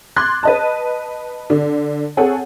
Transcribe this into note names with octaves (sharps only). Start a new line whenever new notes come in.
C6 D6 F#6 G#6 A6
B4 D#5 A5
D3
C4 G#4 A4 C#5 F#5